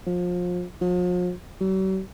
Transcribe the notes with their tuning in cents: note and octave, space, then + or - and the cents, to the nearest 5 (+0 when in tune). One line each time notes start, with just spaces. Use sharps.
F3 +30
F3 +45
F#3 +45